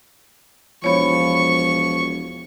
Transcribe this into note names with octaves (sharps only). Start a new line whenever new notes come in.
E1 F3 C#5 B5 C#6